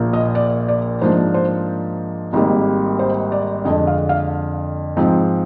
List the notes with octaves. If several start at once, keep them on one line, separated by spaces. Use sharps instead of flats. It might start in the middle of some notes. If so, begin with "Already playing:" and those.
Already playing: A#1 A#2 F3 A#3
D#5
D5
D5
G#2 F3 A#3 D4 C5
C5
G#1 G#2 G3 A#3
C5
D5
F2 D3 G#3 D4 D#5
F5
F5
G#2 F3 C4